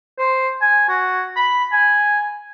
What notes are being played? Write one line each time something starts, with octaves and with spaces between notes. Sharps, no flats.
C5
G#5
F#4
B5
G#5